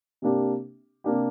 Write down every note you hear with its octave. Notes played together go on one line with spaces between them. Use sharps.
C3 A#3 D4 G4
C3 A#3 D4 G4